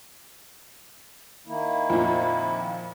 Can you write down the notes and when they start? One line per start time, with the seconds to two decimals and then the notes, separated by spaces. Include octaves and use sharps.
1.47 D#3 A#3 E4
1.90 F2 A#2